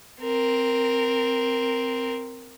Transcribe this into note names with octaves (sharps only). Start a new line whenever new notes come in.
C4 A#4